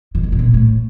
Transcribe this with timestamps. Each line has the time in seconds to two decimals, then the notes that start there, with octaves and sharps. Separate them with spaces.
0.15 D#3
0.23 D3
0.32 C3
0.39 A#2
0.54 A2